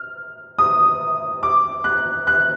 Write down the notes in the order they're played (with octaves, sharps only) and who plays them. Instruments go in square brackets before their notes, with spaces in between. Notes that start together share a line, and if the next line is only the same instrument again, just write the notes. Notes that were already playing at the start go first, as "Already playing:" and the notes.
Already playing: [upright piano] F6
D#6
D6
F#6
F#6